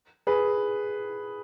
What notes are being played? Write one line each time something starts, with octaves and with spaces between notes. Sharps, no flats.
G#4 B4